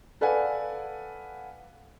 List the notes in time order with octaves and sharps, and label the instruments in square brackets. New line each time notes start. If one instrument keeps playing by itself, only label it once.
[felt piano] A4 B4 D5 F5 F#5 G#5